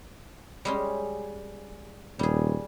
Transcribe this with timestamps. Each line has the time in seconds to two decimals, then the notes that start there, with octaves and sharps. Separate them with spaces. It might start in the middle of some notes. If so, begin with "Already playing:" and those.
0.65 G3 G#3 C#4
2.19 D#1 G3 G#4